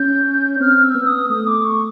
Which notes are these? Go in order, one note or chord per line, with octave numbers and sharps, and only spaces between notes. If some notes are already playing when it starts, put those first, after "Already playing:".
Already playing: C#4 G6
C4 F6
E6
B3
D#6
A3 D#6
D6
C#6